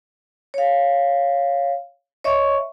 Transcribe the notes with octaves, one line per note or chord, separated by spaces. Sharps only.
C#5 F5
C#5 D#5 E5 C#6